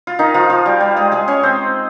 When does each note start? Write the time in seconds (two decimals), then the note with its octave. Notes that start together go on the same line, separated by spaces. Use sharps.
0.07 F4
0.19 D#3 D#4
0.34 F3 F4
0.50 F3 F4
0.65 G3 G4
0.81 G3 G4
0.96 G#3 G#4
1.12 G#3 G#4
1.28 C#4 C#5
1.43 C4 C5